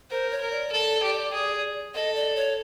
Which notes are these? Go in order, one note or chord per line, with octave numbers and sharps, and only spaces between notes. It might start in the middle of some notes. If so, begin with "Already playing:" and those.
A#4 C5
C#5
A#4
D5
A4
G4
G#4
A4 D#5
D5
C#5